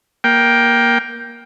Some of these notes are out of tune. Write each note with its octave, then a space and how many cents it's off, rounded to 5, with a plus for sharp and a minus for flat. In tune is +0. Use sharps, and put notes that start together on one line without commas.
A#3 +15 G5 +0